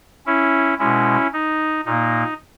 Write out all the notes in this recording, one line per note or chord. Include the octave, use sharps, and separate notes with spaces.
C#4 E4
B2 G#3 C#4 E4
D#4
A#2 A#3 D#4